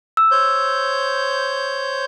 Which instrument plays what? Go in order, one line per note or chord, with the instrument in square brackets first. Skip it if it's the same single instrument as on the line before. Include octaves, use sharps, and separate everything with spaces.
[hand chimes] E6
[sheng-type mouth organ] C5 C#5 G6